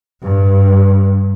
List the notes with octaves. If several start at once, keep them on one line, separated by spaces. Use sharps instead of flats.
G2